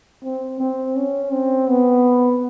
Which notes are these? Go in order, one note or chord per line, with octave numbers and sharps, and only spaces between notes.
C4
C4
C#4
C4
B3